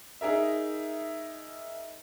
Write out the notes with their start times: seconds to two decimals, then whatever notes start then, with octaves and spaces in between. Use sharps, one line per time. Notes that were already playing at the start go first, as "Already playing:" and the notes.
0.21 D#4 G#4 A#4 E5